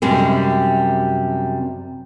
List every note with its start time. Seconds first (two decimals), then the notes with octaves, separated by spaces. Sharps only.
0.02 F#2 C3 G3 G#3 C4